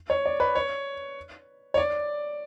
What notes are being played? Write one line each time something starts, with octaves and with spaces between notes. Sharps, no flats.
C#5
D5
B4
C#5
C#5
D5